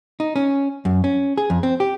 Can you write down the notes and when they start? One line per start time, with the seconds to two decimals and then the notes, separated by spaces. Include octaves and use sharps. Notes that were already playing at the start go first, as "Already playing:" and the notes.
0.20 D#4
0.36 C#4
0.85 F#2
1.04 C#4
1.38 G#4
1.50 F2
1.63 C4
1.80 G4